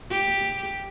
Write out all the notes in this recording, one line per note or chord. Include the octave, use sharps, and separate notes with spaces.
G4